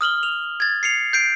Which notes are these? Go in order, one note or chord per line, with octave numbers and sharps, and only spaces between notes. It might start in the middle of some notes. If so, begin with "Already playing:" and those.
D#6 F6 F#7 G7
F7
G#6 A6
C7 C#7 F7
G6 C7 D7